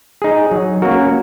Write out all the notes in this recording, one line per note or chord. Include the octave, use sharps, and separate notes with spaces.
D#4 G#4
F#3
A#3 C#4 F#4 A#4